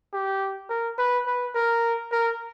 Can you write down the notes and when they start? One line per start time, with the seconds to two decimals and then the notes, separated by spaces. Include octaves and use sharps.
0.13 G4
0.70 A#4
0.98 B4
1.26 B4
1.55 A#4
2.12 A#4